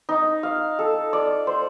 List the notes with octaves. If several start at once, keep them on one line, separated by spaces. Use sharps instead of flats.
D#4
F5
A4
D5
C5